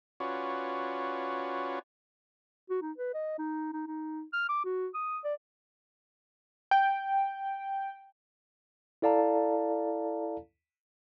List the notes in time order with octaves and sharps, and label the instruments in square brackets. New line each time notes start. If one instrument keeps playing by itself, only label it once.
[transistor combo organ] C#4 F4 F#4 B4 C#5 D5
[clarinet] F#4
D#4
B4
D#5
D#4
D#4
D#4
F6
D6
F#4
D#6
D5
[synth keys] G5
[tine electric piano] E4 A4 D5 F5 A5 A#5